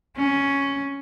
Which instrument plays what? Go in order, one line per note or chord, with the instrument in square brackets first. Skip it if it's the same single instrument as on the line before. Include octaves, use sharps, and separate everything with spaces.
[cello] C#4